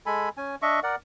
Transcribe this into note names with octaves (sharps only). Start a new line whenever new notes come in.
G#3 A4 G#5 B5
C#4 G#5
D4 D#5 E5 C#6
A#4 D5 F#5